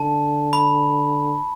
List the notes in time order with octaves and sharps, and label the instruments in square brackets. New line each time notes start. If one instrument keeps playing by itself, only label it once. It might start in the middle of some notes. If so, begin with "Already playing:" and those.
Already playing: [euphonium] D3 [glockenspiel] A5
[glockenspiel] B5